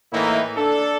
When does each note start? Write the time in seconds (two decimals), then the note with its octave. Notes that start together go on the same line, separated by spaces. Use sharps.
0.12 A2 E3 A#3 D#4 E4
0.56 D4 A4